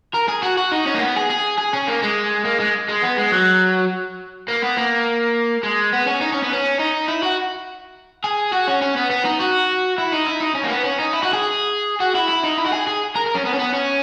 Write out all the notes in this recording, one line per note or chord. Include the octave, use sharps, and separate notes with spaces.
A#4
G#4
F#4
F#4
D#4
C#4
A#3
B3
G#4
G#4
G#4
C#4
A#3
G#3
A#3
G#3
G#3
B3
G#3
F#3
A#3
B3
A#3
G#3
B3
C#4
D#4
C#4
B3
C#4
D#4
E4
F#4
G#4
F#4
C#4
C#4
B3
B3
D#4
F#4
E4
D#4
E4
D#4
C#4
A#3
B3
C#4
D#4
E4
F#4
G#4
F#4
E4
E4
D#4
E4
F#4
G#4
G#4
A#4
A#4
C#4
B3
C#4
B3
C#4